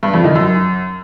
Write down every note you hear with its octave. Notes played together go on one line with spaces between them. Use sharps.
G2
F2
D#3
F#2